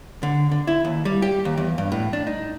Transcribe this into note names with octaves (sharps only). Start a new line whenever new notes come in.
D3
D3
E4
D#2
G3
G4
D#2
E2
G2
A2
D4
D#4